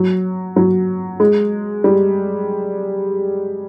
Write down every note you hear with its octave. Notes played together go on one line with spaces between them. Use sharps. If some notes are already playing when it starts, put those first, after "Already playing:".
Already playing: F#3
F#3
G#3
G3